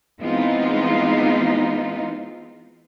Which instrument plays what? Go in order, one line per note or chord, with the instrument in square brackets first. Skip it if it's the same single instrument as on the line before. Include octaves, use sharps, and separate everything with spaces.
[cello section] E3 G#3 B3 C4 D#4 F4